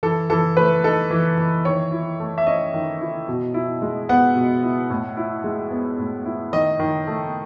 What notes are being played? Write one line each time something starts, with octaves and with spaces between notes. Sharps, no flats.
E3 A4
E3 A4
A3 B4
D#4 A4
E3
E3
D#3 C#5
E4
A3
E5
C#4 D#5
D#3
E4
B2
E4
G#3
B3 F#5
B2
E4
A2
E4
G#3
B3
A2
E4
D#3 D#5
D#3
A3